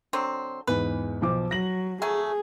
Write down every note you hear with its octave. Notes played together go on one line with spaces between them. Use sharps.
D3 F#3 C4
E2 G#2 B4
B1 F3 D6
F#3 A#6 F#7
F#3 A3 G#4 G#5